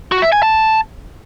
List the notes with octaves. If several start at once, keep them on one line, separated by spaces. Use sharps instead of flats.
F#4
E5
G#5
A5